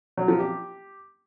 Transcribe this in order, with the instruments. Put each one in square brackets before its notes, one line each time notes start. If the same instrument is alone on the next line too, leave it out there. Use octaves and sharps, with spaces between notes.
[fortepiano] F#3
F3
G4